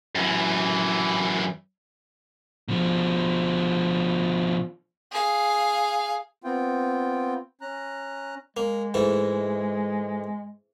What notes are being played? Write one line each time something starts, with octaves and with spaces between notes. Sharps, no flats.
F#2 E3
B2 F3
G#4 F5
B3 C4 F4 G5
C#4 A#5 F#6
G#3 A#3
G#2 E3 A3